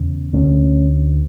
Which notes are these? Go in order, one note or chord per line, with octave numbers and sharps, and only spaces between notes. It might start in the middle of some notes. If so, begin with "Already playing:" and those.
Already playing: E2 C#3
D2 D3 A3 C#4